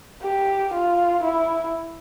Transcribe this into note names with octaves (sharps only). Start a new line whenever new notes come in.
G4
F4
E4